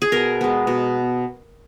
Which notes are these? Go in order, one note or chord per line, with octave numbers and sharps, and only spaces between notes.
G#4
B2 A#4
G#3 B3
B2